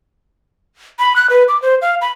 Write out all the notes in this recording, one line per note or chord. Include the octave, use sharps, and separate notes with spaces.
B5
F#6
B4
D6
C5
F5
B5